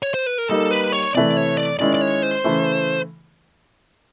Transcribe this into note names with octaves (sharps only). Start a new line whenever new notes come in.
C#5
C5
B4
A#4
G3 A#3 D#4 A4
B4
C#5
C3 E3 A3 D5
C#5
D5
D#3 G#3 C#4 E4 D5
D5
C#5
C5
C#3 E3 A3